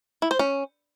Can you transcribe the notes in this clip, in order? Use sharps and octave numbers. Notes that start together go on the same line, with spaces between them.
E4
C5
C#4